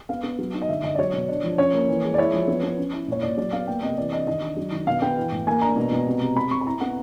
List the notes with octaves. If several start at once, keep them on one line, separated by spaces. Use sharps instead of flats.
B3 F5
B3
F#3
D#4
D#5
D3 E5
D3 D#5
D5
F#3 C#5
B2
D4
F3
C#4 C#5
A#3
E3
G#3
D5
E4 C#5
F3
B3
B3
C#4
E4
A#2 C#5
A#2 D5
F#3 D5
B3 F5
A#3 G5
C3 D#5
E3 D5
D4 D#5
D#3 D#5
D4
F#3
D#3
B2 F5
B3 G5
E3
A2
A#3 G#5
D4 A#5
B2
B2
C3
C3
C3 B5
C3 C#6
B5
E4 A#5
B3 F#5